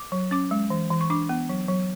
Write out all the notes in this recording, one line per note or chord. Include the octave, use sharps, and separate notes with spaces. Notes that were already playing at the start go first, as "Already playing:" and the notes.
Already playing: D6
F#3
C#4 D6
G#3
E3
E3
C#6
D4 D6
B3
F#3
F#3